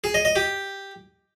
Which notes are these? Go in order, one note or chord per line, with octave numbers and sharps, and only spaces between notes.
G#4
D#5
D#5
G4